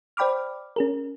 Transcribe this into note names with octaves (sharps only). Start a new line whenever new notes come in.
C5 D5 G5 B5 D6 F6
C#4 G#4 A#4